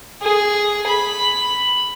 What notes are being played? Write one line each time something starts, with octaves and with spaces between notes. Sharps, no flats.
G#4
B5